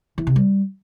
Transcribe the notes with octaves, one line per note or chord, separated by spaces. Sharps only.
E3
C3
G3